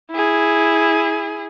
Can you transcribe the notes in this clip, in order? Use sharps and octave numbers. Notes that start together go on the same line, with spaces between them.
E4 G#4